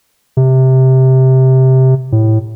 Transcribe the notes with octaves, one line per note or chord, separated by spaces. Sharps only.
C3
A2